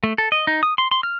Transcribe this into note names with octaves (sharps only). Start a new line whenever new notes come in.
A3
A4
D#5
D#4
D#6
C6
C6
F6